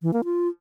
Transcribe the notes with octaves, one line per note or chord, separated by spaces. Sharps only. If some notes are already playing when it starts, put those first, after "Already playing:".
E3
A#3
F4